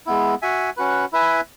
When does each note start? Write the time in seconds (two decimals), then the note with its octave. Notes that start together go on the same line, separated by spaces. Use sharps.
0.06 G#3 B3 E4
0.42 F#4 E5 G#5
0.77 C#4 F#4 B4
1.13 E4 B4 E5 G#5